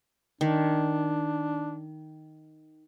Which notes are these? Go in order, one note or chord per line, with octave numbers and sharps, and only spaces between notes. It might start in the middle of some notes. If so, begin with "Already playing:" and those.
D#3 D4